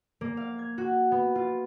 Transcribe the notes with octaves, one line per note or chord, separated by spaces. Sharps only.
A#3
F5
G#6
F#4
B3
F4